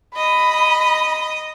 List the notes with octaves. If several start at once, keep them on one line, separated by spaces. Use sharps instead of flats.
D#5 B5